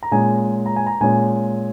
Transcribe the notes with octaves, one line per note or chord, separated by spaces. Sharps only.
A#5
A#2 G#3 C#4 G#5
A#5
G#5
A#5
A#2 G#3 C#4 G#5